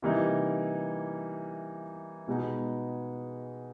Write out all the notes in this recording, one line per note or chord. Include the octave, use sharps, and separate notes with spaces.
C3 E3 G3 A#3 D#4
B2 G#3 B3 D#4